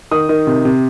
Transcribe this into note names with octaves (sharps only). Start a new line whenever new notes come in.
D#3 D#6
D#3
C3
C3